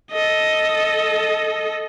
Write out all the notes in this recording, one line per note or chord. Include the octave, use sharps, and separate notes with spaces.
A4 D#5